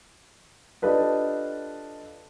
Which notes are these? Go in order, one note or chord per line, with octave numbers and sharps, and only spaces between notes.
D4 F4 G4 A4 B4 D#5